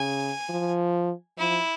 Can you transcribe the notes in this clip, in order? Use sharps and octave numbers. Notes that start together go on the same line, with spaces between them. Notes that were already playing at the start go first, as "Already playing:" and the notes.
Already playing: C#3 G#5
F3
F3 E4